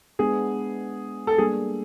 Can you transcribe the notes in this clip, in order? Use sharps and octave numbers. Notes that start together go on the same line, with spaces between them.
G#3 B3 D4 G#4
A4
G3 A#3 D4 G#4